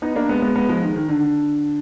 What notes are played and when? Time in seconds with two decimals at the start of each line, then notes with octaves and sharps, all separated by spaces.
0.02 B3 D#4
0.16 A#3 D4
0.29 G#3 B3
0.42 G#3 B3
0.56 G#3 B3
0.69 F3 G#3
0.82 D#3
0.96 D#3
1.09 D3